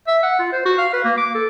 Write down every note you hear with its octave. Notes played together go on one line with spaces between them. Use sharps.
E5
F#5
F4
C5
F#4
F5
B4
A#3
D6
A4